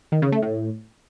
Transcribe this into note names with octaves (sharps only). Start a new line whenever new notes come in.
D#3
C#3
A3
A2